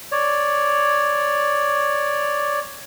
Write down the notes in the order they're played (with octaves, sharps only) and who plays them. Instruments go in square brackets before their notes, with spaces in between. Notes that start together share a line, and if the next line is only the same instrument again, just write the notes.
[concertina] C#5 D5